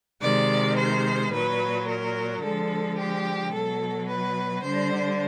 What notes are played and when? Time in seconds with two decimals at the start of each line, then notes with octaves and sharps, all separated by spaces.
0.21 C3 D#3 G#3 D5
0.77 C5
1.32 A#2 F#3 B4
1.87 A#4
2.42 D3 F3 G#3 A4
2.98 G4
3.53 B2 F#3 A4
4.08 B4
4.63 D3 G3 C5